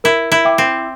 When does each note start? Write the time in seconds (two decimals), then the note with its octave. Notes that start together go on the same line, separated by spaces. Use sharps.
0.04 E4 A#4
0.32 E4
0.45 E5 G5 D6
0.58 C4